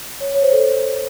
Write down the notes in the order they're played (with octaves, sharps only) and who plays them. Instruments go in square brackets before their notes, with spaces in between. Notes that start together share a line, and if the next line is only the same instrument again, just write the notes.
[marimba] C#5
C#5
C5
A4